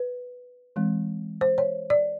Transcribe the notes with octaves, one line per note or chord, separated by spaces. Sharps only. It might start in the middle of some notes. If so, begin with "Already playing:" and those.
Already playing: B4
E3 G#3 C4
C5
C#5
D5